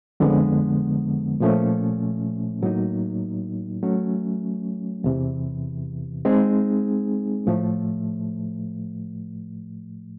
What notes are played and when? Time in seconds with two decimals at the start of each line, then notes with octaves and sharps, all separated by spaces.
0.20 F2 D3 F3 G#3 B3
1.40 A#2 F3 A3 C#4
2.62 A2 F#3 A#3 D#4
3.82 F#3 A3 C#4
5.04 E2 C3 E3
6.25 G#3 C4 D#4 G#4
7.47 A2 F3 A3